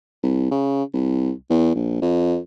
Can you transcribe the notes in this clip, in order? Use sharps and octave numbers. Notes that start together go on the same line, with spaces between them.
C2
C#3
C2
E2
A#1
F2